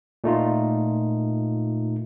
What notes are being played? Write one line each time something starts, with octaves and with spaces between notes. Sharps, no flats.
A#2 A3 D#4 F4